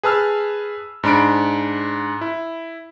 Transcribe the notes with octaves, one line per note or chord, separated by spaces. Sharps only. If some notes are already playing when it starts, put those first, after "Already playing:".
G#4 B4 A5 E6 F6
G#2 D4 B5 D7
E4